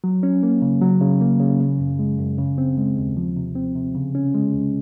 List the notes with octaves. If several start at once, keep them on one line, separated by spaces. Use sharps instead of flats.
F#3
C#4
A#3
C#3
F#3
C#3
A#3
C#3
C#3
F#2
G#3
F#2
C#3
C4
G#3
D#2
F3
C3
C4
C3
C#3
C#4
G#3
C#2